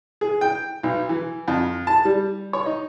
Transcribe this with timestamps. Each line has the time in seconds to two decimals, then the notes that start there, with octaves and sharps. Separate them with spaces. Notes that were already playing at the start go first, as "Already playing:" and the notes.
0.21 G#4
0.41 G5
0.83 B1
1.09 E3
1.48 F2
1.87 A5
2.05 G3
2.53 C#5
2.66 D#4